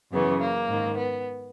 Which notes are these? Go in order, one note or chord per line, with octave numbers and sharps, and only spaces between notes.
F#2 C#3 E3 B3
A#3
G#2 D#3
B3